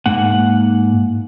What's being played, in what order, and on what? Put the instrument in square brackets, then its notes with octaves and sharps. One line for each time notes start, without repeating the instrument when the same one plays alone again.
[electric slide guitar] G#2 A#3 F#5